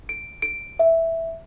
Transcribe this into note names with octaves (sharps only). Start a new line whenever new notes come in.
D7
D7
E5